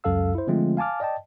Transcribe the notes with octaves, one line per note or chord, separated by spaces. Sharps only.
C#2 F#2 A4 F5 E6
E4 C5
D3 F3 G#3 A3 C4 F4
F5 G#5 A5 D6 F6
D5 D#5 G5 A5